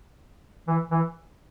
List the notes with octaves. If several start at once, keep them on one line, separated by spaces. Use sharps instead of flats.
E3
E3